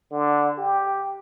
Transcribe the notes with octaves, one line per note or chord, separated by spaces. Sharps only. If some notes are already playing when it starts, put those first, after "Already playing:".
D3
G4